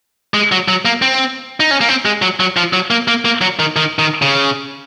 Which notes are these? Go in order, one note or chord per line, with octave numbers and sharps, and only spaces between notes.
G#3
F#3
F#3
A#3
C4
D#4
C#4
A#3
C4
G#3
F#3
F#3
F3
F#3
A#3
A#3
A#3
F#3
D#3
D#3
D#3
C#3